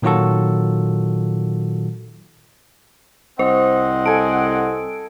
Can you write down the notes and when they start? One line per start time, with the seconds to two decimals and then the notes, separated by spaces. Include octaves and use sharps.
0.02 A#2 D#3 F#3 F4 F#4 A4
3.39 C2 C4 C5 D#5 F#5
4.06 A4 G#5 D7